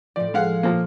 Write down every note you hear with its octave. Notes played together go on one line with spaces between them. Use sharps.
A2 F3 D5
G#3 F5 F#5
A#2 F3 A#3 F4